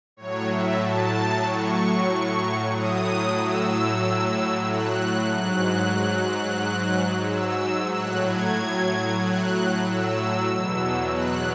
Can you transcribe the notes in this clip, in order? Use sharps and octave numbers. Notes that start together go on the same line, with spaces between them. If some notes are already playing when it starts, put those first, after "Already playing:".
A2 F#3 C#5
E5
A5
C#6
A2 F#3 D#6
E6
F#6
G#2 F#3 F#6
E6
A2 F#3 F#6
G#6
F#6
E6
E2 B2 F#3
F#6